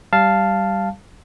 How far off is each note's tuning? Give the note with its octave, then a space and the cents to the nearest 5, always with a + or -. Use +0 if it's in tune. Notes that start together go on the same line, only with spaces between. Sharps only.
G3 -5 F5 -5 A5 +0